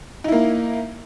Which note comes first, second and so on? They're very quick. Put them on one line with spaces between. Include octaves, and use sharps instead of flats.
D#4 E4 A#3